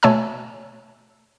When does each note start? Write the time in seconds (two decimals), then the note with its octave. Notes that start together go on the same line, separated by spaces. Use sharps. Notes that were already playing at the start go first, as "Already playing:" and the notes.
0.03 B2 A3 C#5 G#5 A5 E6